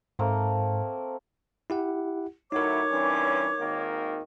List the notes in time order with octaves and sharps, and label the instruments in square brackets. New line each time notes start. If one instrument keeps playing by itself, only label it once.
[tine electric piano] G#2 [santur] A3 A#3 C4
[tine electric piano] E4 G4 F#5
[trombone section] A2 F#3 E4 [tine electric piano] D#4 A#4 [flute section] C#5 D6
[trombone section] G2 E3 C#4
G#1 D#3 A#3